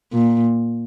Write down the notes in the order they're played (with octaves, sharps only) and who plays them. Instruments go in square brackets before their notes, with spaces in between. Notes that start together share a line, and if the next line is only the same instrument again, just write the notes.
[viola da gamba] A#2